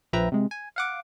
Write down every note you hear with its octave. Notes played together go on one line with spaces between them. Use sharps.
A#1 F3 B4 E5 G5 A#5
C3 G#3
G#5
F5 F#5 D6